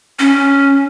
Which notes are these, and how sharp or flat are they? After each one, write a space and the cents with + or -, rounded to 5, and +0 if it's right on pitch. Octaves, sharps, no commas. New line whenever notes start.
C#4 +0